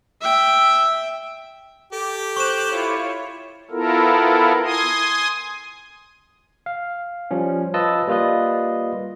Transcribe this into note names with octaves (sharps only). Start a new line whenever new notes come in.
E5 G5
G4 A4 D6
C5 C#6 F#6 G6 E7
E4 F4 C#5
B3 E4 F4 A4 A#4
G#5 C6 D#6
F5
F3 G3 C#4
F4 B4 D#5 A5 E6
G3 A#3 F4 B4 D#5